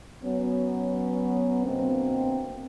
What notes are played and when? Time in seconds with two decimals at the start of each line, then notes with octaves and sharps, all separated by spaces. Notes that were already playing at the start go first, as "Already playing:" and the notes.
0.23 F#3 B3 C#4
1.64 D2 B2 A#3 C4